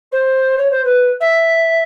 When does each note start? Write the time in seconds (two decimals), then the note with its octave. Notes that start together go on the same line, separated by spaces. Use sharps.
0.12 C5
0.57 C#5
0.70 C5
0.84 B4
1.20 E5